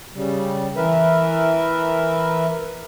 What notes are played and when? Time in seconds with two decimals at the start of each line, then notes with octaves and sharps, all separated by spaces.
0.15 C#3 G3
0.77 E3 A#4 B4 E5